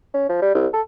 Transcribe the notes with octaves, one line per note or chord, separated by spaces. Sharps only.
C#4
F3
G3
C2
A4